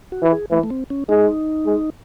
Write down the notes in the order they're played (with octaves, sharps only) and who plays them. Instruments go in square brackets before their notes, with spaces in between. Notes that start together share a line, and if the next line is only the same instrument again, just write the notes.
[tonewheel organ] F#4
[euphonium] E3
[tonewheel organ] G#4
[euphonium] E3 [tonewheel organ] A3
[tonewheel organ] A3
C4
C#4
[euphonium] G#3 [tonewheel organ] D#4
[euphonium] G#3